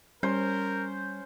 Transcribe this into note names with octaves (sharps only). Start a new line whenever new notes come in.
G3 C#4 A#4 C5